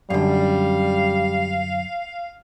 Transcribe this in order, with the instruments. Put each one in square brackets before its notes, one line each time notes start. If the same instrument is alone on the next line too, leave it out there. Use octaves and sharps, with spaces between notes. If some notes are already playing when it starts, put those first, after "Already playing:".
[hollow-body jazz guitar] F#2 D3 [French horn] G3 [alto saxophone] F5